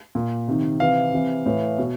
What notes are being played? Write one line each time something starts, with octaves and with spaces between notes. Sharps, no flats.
A#2
C3 D#3
C3 E3 F5
C3 E3
A2 E3
B2